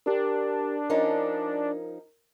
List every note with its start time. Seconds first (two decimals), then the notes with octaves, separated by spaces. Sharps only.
0.06 D4 G4 A#4
0.90 F3 C#4 D#4 A#4